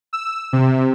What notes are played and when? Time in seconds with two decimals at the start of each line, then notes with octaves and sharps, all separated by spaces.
0.13 E6
0.53 C3